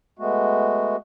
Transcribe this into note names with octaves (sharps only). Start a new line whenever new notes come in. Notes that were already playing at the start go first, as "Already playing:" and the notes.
G#3 A3 B3 F#4